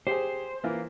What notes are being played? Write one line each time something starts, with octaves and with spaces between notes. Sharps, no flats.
G4 G#4 C5
E3 A#3 F4